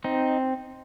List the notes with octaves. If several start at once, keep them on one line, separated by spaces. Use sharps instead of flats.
C4 D#4